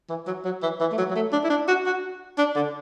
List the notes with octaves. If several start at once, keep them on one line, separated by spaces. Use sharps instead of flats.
E3
F#3
F#3
E3
E3
A3
F#3
F#3
A3
D4
E4
D4
F#4
F#4
D4
D3